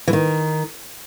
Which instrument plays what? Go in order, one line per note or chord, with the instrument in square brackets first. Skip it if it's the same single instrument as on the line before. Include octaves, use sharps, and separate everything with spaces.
[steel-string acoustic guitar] E3
D#3